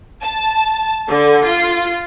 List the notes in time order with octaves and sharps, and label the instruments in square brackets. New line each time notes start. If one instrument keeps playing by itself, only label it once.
[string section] A5
D3
F4